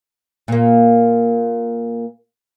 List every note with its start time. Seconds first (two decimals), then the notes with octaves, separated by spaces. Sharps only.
0.48 A#2 A#3